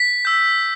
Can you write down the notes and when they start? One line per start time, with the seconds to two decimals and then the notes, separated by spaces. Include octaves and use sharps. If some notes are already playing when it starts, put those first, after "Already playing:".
Already playing: B6
0.25 E6 G6